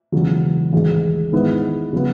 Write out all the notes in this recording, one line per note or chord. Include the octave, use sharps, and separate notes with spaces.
E1 E2 C#3 F#3
A1 G#2 D#3 G#3
G#2 D#3 G#3 B3 E4
C#3 F#3 B3